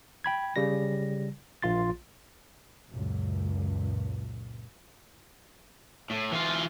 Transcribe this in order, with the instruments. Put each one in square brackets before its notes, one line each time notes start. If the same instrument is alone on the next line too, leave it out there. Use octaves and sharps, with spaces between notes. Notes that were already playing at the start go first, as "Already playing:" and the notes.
[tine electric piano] G5 B5 G#6
C#3 G3 A#6
A#1 F4 C6 A6
[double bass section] C#2 F#2 A#2
[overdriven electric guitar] A2
E3 F4